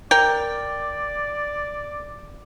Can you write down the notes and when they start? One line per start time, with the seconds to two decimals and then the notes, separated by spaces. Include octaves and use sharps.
0.11 A#4 D5 G5